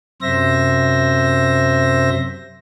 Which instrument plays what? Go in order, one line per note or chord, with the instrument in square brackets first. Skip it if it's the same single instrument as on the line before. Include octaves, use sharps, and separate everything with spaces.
[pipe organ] F#2 C3 C5 E5 A#6